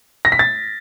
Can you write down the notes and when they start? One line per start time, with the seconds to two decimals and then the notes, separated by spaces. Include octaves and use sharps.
0.25 A#6
0.32 B6
0.39 A6